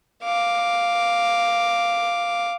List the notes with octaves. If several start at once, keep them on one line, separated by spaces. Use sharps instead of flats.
F5 D6